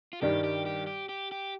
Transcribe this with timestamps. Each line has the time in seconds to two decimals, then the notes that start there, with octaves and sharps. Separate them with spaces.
0.13 F4
0.22 G2 D#3 G3 G4
0.44 G4
0.66 G4
0.87 G4
1.09 G4
1.32 G4